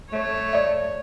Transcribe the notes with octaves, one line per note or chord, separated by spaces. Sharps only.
A3 C#5
D5 E5